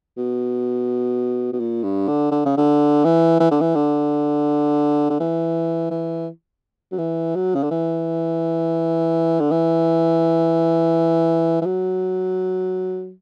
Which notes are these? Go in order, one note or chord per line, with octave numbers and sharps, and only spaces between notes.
B2
B2
A#2
G2
D3
D3
C#3
D3
E3
E3
D3
E3
D3
D3
E3
E3
F#3
E3
F#3
C#3
D3
E3
D3
E3
E3
F#3